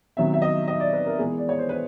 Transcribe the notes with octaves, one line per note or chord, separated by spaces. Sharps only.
C3 D#3 F#3 B3 E5
E5
D#5
D#5
D5
B4
A#4
E3 G#3 B3 G#4
D5
C#5
C5
B4